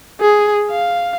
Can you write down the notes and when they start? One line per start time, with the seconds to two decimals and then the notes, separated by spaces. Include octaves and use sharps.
0.21 G#4
0.71 F5